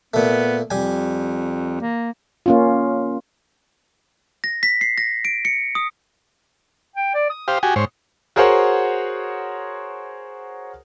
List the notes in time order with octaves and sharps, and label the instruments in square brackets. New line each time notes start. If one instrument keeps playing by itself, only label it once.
[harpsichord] A#2 A3 [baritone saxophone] B3
[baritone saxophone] F2 [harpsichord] G3 G#5
[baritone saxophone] A#3
[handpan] A#3 C#4 F4
[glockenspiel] A#6
B6
C7
A#6
D7
C#7
D#6
[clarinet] G5
D5
D#6
[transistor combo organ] G4 C5 F5
F#4 G4 G#5
G#2 C5 C#5
[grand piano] F#4 G#4 A#4 C5 C#5 F#5